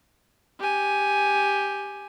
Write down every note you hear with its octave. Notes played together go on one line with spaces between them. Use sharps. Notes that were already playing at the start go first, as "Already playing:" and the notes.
G4 G#5